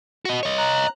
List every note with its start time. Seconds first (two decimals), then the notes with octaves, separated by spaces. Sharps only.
0.25 F#4 D#5
0.43 C#5 D#5
0.58 A#5 F#6